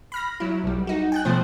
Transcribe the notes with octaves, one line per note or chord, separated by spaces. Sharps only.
B5 F6 A#6
F#3 E4
B1 G3
D#4 F#4
G5 G#5 F#6
B2 F3 A3 C5